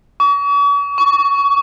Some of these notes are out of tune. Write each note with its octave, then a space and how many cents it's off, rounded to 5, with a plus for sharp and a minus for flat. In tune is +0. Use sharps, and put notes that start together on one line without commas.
C#6 +45
C#6 +20